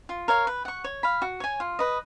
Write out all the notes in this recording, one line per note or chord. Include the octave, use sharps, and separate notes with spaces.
F4
A#4 C#5 F5
B4
F#5 C#6
C#5
F5 B5
F#4
C#5 G#5
F4
B4 D#5